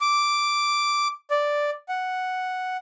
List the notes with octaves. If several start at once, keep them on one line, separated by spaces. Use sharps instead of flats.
D6
D5
F#5